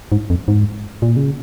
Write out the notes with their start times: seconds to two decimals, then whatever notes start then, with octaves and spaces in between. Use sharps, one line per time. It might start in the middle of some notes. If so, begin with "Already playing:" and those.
0.12 G#2
0.30 F2
0.48 G#2
1.02 A#2
1.17 C#3